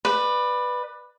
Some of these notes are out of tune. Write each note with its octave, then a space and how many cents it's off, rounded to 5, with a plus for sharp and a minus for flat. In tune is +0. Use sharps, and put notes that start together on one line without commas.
B4 +0 D5 +25